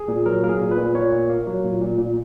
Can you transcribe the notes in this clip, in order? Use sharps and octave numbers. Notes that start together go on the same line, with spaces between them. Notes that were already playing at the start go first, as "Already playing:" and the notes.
Already playing: G#4
A#2
F#3 A#4
A#3 A#4
G#4
A#2
B4
A#2
A#2 C#5
A#3
A#3
F#3
A#2
A#2
A#2